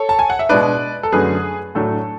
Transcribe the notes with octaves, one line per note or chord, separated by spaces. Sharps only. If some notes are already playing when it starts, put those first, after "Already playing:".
Already playing: A4 C#5
A5
G#5
F#5
E5
B2 G#3 D4 B4 D5
A4
F#2 D3 F#3 A3 G#4 B4
A2 F#3 A3 D4 A4